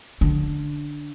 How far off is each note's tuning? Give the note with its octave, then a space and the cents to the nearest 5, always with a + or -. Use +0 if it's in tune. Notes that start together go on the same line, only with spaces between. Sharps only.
D3 +0 C#4 +0